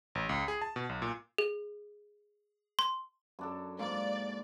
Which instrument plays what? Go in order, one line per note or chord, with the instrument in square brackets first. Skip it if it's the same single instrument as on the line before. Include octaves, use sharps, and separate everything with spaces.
[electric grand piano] A1
C#2
G#4
A5
B2
B1
A#2
[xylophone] G#4
C6
[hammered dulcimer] F#2 D4 A4
[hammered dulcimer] G#2 A#3 [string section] D5